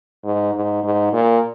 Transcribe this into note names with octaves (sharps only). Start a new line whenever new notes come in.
G#2
G#2
G#2
A#2